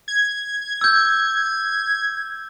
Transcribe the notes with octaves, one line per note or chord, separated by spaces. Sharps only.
G#6
E6 G6